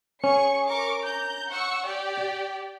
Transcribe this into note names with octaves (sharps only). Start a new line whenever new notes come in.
C#4 G#4 C#6 C#7
A#4 C#6 D6
A#5 G6
F#5 C#6 E6
G4 D5 G5